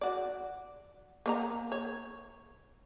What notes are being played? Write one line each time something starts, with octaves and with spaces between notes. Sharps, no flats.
F#4 D5
A#3 C#5 A#5
C#5